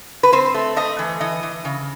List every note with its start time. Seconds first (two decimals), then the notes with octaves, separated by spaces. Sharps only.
0.23 B4
0.32 C4 C5
0.54 A3
0.76 A3 D#5
0.99 E3
1.20 E3 D#5
1.43 E3
1.65 C#3